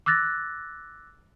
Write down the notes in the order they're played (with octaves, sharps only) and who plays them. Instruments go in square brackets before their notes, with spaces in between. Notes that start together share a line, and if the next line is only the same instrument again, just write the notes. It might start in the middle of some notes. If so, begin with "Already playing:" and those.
[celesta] D6 E6 F#6 A6 A#6